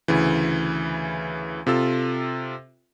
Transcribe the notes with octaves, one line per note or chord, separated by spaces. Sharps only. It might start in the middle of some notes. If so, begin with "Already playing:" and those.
D2 C#3 E3
C3 F4 A4 E6